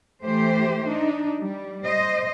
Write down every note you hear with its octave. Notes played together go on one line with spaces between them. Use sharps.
E3 A3 G4 C5
D4 D#4
G3
C5 D#5